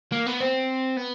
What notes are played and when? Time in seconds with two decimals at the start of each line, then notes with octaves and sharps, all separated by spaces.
0.12 A#3
0.27 B3
0.41 C4
0.97 B3